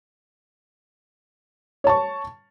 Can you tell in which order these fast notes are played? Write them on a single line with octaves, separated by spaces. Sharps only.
C#5 A5 C#6